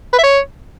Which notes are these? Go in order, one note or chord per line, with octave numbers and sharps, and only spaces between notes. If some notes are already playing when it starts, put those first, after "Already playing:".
B4
E5
C#5